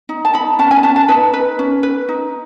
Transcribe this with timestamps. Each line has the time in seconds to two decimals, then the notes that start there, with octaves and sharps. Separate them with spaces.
0.09 D#4
0.25 A5
0.34 D#4 B5
0.59 C#4 A5
0.71 G#5
0.83 C#4 A5
0.96 A5
1.08 D#4 B4
1.34 B4
1.59 C#4
1.83 B4
2.09 D#4